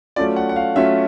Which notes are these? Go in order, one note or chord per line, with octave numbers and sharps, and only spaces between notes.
F#3 A3 C#4 F4 D5
F#5
F#5
F5
F#3 A3 C#4 F4 E5